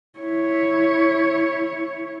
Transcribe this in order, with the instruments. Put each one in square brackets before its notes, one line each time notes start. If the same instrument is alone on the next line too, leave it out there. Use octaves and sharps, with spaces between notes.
[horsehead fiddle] E4 C#5